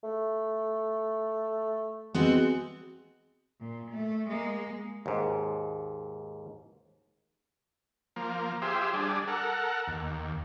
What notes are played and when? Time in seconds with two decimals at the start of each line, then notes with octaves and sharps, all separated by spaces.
0.03 A3
2.14 G#3 B3 C4 F#4
3.60 A#2
3.91 A3
4.29 G#3 A#3
5.06 D#2 G#2
8.16 F3 A#3
8.62 F4 G4 G#4 C5 E5
8.94 G3 D4 G#4
9.28 A4 A#4 F#5
9.88 D#2